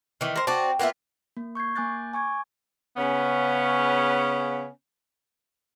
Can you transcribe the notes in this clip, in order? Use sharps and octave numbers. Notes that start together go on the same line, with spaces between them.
D#3 E3
A#4 C5
C4 F#4 D5 A5
A#3 B3 F4 E5 F#5
A#3
C#6 G6 G#6 C7
A#3 G#5 D6 F#6 G6 A6
G#5 C#6 D6 G#6
C#3 B3 C#4